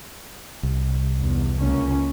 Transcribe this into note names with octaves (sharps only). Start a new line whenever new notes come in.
C2
E2
C#2 A#3 C#4